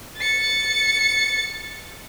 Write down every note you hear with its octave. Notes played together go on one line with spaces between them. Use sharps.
A6 C#7